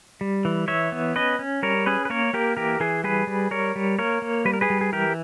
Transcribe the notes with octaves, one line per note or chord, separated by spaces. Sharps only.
G3
E3
E3 C#5 E5
B3
C#4 B4 D#5
C#4
G3 A#4 C#5
C#4 G#4 B4
B4
A#3 A#4 C#5
A#3 G4 A#4
E3 G4 A#4
E3 G#4
G3 G#4 B4
G3
G3 A#4 C#5
G3
A#3 A#4 C#5
A#3
G3 B4
A#4
G#4 B4
G3
G#4
E3 G4 A#4